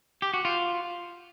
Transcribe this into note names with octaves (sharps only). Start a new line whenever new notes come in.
G4
F#4
F4